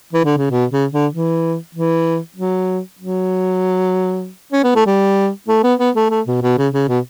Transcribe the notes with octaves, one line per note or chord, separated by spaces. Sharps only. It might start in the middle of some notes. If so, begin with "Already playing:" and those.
E3
D3
C#3
B2
C#3
D3
E3
E3
F#3
F#3
C#4
B3
A3
G3
A3
B3
B3
A3
A3
B2
B2
C#3
C#3
B2